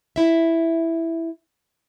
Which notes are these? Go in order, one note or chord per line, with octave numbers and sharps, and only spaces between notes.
E4 E5